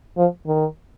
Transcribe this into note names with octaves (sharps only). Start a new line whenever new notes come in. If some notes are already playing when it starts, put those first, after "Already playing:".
F3
D#3